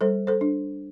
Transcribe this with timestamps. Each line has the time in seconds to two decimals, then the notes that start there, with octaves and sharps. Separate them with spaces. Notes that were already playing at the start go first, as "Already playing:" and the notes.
0.01 G3 A4 C5
0.27 A4 C5
0.41 D4